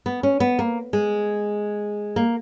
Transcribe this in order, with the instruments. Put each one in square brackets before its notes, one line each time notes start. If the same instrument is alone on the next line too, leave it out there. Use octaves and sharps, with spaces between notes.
[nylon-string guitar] B3
C#4
B3
A#3
G#3
A#3